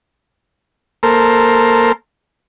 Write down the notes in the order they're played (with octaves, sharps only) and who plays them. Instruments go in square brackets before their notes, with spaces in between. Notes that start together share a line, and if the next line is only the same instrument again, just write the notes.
[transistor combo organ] A#3 A4 A#4 C5